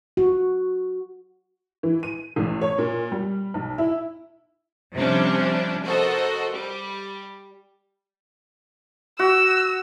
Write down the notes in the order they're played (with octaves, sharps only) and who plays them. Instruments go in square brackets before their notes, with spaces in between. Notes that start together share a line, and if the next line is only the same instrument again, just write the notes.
[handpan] F#4
[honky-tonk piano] E3
D#7
A1
C#5
A#2
G3
B1
E4
[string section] C3 F3 G3 C#4 D4
F#4 A4 A#4 C5 D#5
G3
[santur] F#4 [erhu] E6